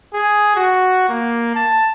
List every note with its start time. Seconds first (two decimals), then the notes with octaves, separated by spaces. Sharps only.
0.13 G#4
0.56 F#4
1.09 A#3
1.55 A5